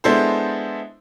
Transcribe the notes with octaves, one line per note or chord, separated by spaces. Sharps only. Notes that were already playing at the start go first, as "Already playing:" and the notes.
G#3 B3 D4 E4 A4 C5